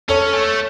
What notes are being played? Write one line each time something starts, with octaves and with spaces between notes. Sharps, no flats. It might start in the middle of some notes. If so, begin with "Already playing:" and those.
C#4 A4 C#5
A3